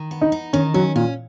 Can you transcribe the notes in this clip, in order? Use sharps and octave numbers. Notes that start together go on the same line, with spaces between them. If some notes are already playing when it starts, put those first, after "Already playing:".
Already playing: D#3
B3
D#4
D#4
D#3 C#4
F#3 C#4
A#2 C#4